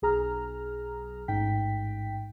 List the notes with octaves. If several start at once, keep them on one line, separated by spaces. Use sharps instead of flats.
B1 G#4 A#5 F6
A1 G#2 G5 B6